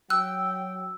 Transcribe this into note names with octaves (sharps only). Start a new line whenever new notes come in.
F#3 G5 E6 F#6